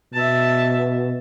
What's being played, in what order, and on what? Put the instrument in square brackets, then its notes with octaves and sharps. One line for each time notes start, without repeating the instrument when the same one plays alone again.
[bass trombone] B2 [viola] E5 A5